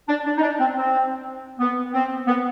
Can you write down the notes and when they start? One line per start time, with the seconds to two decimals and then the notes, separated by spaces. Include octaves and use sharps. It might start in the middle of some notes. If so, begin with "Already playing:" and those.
0.08 D4
0.25 D4
0.37 D#4
0.42 D4
0.59 C4
0.75 C4
1.59 B3
1.93 C4
2.27 B3